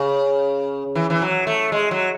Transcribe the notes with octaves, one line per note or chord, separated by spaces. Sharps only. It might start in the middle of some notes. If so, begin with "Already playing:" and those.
Already playing: C#3
E3
E3
F#3
A3
G#3
F#3